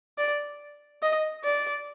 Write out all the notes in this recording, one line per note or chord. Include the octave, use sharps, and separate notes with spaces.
D5
D#5
D5